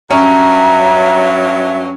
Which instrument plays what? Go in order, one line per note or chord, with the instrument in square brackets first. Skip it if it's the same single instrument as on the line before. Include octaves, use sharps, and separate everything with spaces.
[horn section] G2 F#3 [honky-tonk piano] C#4 [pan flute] E5 [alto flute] A#5